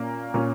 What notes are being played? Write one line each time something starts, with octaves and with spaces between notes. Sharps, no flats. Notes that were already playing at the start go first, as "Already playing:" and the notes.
Already playing: A#2 A#3 C#4
A#2 A#3 C#4